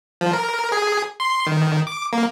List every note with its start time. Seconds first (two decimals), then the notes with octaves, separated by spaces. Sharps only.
0.21 F3
0.33 A#4
0.72 G#4
1.20 C6
1.47 D#3
1.87 D6
2.13 A#3